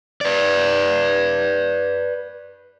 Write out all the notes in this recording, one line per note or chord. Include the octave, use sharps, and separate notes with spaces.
B4 D5